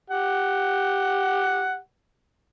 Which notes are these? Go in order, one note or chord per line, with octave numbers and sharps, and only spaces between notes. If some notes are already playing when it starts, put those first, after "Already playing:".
G4 F#5